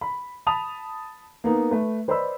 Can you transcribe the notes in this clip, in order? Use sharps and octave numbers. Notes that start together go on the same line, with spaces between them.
B5
A5 B5 D#6 F7
A#3 B3 D#4
A3 B4
B4 C5 D5 D#5 B5 E6